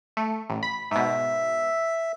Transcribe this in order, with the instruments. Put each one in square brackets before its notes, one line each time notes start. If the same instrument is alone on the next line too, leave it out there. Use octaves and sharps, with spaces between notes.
[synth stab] A3
A1
B5
[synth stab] G#2 B2 [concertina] E5